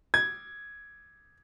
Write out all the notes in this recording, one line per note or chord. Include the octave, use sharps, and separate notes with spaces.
G#6